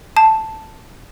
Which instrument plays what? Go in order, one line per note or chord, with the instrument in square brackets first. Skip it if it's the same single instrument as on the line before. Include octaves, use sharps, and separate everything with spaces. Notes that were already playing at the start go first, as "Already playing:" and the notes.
[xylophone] A5